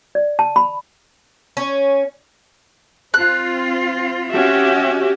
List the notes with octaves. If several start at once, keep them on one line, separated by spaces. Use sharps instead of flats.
D5
A5
B5
C#4
C4 F4 F#6
C#4 F#4 G4 E5